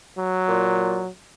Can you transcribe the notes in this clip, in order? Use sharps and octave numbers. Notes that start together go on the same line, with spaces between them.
F#3
A#2